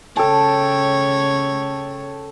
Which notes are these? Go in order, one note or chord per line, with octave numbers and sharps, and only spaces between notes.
C#3 A4 C#5 G5 A5